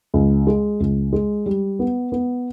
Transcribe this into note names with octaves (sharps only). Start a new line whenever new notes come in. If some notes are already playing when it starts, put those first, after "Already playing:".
C#2
G#3
C#2
G#3
G3
B3
B3